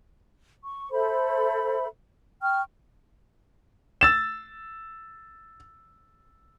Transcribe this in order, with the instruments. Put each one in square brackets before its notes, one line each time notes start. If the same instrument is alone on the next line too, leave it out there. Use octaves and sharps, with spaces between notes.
[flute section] C#6
A4 C5 E5 B5
G5 C#6 F6
[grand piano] E6 A6 E7